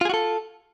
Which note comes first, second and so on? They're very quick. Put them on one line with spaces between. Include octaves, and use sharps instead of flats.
F4 G#4 F#4 A4